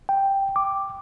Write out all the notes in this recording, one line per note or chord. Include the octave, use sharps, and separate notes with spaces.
G5
D6